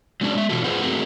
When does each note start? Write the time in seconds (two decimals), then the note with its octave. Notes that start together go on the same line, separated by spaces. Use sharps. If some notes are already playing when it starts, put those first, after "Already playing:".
0.21 F#3 G#3 C#4 D4
0.35 G#3 E5
0.49 B2 E3 F4 F#4 A4
0.64 F4 G#4 B4 C5 F#5
0.82 A3 C4 F#4 G#4 A#4